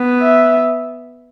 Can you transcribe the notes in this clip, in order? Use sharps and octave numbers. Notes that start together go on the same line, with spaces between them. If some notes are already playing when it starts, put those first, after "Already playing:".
Already playing: B3
E5